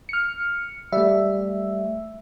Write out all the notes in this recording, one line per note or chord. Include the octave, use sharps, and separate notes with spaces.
F6 C#7
G3 A3 E5